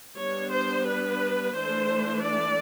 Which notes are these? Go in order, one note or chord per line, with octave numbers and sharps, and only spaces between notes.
G3 B3 D4 C#5
C5
B4
E3 A3 D4 C5
D5